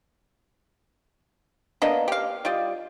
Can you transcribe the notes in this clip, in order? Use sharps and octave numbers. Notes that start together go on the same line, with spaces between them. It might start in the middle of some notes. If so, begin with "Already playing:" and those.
A#3 B3 D4 D#5
G4 F5
G3 F4 D5 D#5